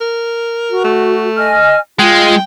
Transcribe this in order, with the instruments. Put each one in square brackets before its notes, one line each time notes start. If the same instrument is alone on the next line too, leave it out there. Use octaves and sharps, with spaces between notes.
[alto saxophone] A#4
[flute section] F#4
[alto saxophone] A3
[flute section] D#5 G#5 F6
[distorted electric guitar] G#3 [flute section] F4 [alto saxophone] G5